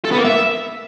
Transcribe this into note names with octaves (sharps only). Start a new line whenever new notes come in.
A4
B3
A#3
E5